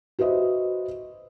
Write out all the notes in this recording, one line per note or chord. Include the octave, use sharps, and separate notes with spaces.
F#4 B4 C5 D#5 E5